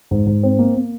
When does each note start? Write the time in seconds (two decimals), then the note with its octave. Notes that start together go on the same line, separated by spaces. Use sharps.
0.11 G#2
0.26 G#2
0.43 C4
0.59 A#3
0.76 A#3